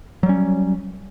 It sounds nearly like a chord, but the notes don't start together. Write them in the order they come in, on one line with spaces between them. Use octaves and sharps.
F#3 G3 C#4